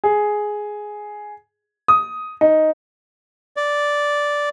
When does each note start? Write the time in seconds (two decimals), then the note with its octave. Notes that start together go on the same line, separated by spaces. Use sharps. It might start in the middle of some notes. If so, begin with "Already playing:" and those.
0.04 G#4
1.88 D#6
2.41 D#4
3.57 D5